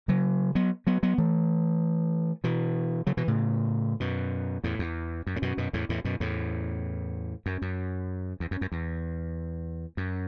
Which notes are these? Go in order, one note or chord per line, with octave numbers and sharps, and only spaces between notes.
C#3 F#3
F#3 B3
F#3 B3
F#3 B3
E3 A3
B2 E3
C#3 F#3
B2 E3
A2 C#3
F#2 B2
E2 A2
E2
F#2
A2
F#2 B2
F#2 B2
E2 A2
E2 A2
F#2 B2
E2 A2
F#2
F#2
E2
F#2
F#2
E2
F#2